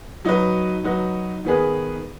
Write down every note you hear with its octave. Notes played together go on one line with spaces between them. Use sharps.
F#3 D#4 F#4 B4
F#3 D#4 F#4 B4
D#3 B3 G#4 B4